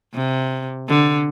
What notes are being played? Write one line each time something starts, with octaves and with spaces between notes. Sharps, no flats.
C3
D3